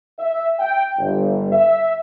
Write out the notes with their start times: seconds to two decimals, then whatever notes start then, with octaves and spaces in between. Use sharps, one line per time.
0.19 E5
0.59 G5
0.98 G1
1.52 E5